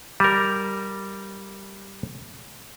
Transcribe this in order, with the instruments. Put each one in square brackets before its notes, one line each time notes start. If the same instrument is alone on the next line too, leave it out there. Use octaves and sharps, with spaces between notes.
[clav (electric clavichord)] G3 A#4